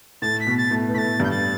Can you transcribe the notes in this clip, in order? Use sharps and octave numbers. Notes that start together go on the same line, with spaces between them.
A2 A3 A6
B6
B2 B3
A6
A2 A3
B3
A2 A3 A6 B6
G2 G3 G6
A6